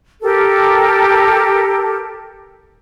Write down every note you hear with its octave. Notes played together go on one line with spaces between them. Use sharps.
G4 A4 A#4